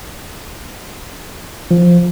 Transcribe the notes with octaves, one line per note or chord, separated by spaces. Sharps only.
F3